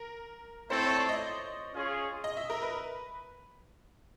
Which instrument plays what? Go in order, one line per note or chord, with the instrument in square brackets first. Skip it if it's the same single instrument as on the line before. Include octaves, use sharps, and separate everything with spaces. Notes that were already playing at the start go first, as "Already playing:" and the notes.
Already playing: [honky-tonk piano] A#4
[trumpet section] A3 C4 E4 A4 [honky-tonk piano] C5
[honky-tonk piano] C#5
D5
D#5
[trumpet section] C#4 F4 G#4 C#5
[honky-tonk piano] D#5
E5
A#4
B4